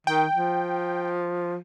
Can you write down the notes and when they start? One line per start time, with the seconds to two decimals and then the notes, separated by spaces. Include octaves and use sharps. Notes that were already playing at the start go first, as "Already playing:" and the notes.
0.07 D#3 G5
0.35 F3